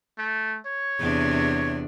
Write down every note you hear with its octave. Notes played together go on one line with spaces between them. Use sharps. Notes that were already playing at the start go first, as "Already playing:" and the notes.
A3
C#5
E2 C3 D4